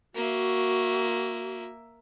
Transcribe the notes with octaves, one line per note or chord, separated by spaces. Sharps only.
A#3 F#4 E5